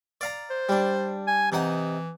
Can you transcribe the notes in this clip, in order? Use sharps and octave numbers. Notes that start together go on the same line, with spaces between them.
D5 F5 A#5
C5
G3 D4
G#5
C3 E3 D#4 F#5